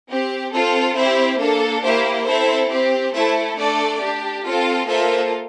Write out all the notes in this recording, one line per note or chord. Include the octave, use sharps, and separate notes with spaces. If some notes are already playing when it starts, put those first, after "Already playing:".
C4 G4
C4 F4 A4
C4 E4 G4 C5 E5
A#3 D4 A4
A#3 E4 G4 C5 E5
C4 E4 A4 C5 E5
C4 G4
A3 E4 A4 C5 E5
A3 D4 A4 D5
D4 G4
C4 F4 A4
A#3 F4 A4 C5 E5